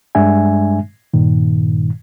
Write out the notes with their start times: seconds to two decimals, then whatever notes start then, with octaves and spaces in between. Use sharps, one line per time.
0.15 G2 G3 G#3 D4 E5 G#5
1.14 G2 A#2 D#3